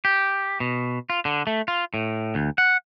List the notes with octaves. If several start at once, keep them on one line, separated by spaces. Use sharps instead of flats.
G4
B2
F4
D3
A3
F4
A2
D2
F#5